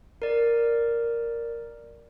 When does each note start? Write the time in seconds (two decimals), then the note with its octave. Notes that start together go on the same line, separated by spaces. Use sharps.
0.22 A#4 D5